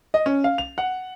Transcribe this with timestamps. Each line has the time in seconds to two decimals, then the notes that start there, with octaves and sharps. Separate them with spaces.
0.14 D#5
0.26 C#4
0.44 F5
0.58 F7
0.78 F#5